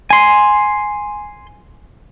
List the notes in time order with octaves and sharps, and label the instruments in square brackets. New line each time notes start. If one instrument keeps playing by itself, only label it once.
[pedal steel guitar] G#5 C6